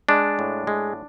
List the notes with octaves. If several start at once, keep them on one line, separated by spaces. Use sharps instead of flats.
G#3 D4
A2
G#3